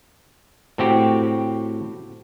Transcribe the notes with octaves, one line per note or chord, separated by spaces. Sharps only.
A2 C4 F#4 G4